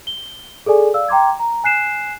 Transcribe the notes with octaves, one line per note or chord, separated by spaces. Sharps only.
G7
G#4 A4 D5 G#5
D5 F5 E6
G5 A#5 C6 D6 G#6
A#5
G#5 F#6 C7 E7